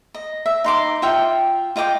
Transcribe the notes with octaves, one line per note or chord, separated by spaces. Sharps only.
D#5
E5
D#4 C6 D6
F4 E5 G5
F4 D#5 G5 D6